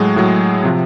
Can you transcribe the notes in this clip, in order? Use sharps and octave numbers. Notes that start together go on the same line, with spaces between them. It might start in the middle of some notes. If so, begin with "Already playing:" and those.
Already playing: A2 F#3 G#3
A2 F#3
C3 F3